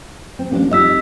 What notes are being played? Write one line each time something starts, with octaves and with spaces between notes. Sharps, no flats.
C4
A1 A#3 B3 D4
F2 G3 D#4 D#5 E6 B6